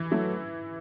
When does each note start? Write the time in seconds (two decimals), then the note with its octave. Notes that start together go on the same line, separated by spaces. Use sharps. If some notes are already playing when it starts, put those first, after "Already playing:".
Already playing: E3 E4
0.11 F#3 A3 E4